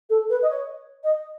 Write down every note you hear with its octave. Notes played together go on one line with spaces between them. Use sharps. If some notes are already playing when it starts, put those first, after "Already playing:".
A4
B4
D#5
C#5
D#5